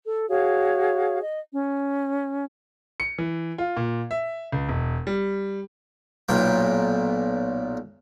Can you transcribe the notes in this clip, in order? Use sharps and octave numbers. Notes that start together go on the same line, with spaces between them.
A4
F#4 G#4 C#5 F5
D#5
C#4
C#7
E3
F4
A#2
E5
C#2
E1
G3
B1 A#2 G5